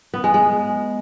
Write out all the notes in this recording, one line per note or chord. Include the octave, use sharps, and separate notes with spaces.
B3
G#3
G#3